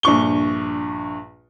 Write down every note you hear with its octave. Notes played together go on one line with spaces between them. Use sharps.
A#1 G2 C#6 G7